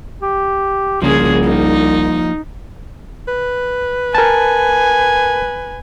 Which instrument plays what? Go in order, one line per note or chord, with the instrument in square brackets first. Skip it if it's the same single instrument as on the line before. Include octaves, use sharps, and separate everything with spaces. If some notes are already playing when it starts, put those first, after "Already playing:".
[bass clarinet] G4
[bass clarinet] C2 [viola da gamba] C#3 G#4 [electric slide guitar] F3 A#3
[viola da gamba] D#4
[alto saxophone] B4
[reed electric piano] A#4 A5 [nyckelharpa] G#5